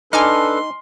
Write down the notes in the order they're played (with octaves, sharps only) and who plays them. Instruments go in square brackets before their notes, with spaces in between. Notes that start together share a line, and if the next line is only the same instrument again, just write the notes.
[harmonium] D4 A4 B4 [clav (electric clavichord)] D#4 [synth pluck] G#5 D6 F6 [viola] C6